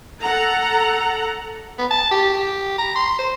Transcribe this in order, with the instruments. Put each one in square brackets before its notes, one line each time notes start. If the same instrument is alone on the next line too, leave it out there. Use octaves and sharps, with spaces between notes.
[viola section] A4 F#5 A#5
[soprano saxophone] B3
A5
G4
G4
A#5
C6
C5